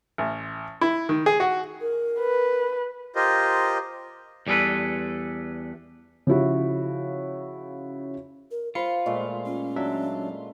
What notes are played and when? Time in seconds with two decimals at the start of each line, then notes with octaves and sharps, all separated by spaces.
0.18 A1
0.81 E4
1.09 D#3
1.26 G#4
1.40 F#4
1.81 A#4
2.19 B4
3.16 F4 G4 A#4 C5 D#5
4.47 E2 G3 G#4 A4 B4
6.27 C#3 F3 E4 F#4
8.51 A#4
8.75 F4 C5 F5 B5 C#7
9.06 A#2 G#3 A3
9.45 C#4
9.76 F#3 D4 E5